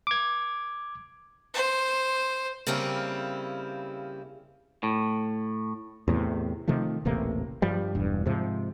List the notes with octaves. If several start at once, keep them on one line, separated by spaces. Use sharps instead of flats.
D6 G#6
C5
C#3 G3 A#3 C4 C#4 E4
A2
E2 A2 C3
C3 D#3 F3 A3
D#1 A1 C3 A#3
G2 F3 G3
E1 G2
G#2 C3 F3